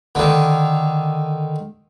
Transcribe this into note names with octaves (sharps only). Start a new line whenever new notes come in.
D3 D#3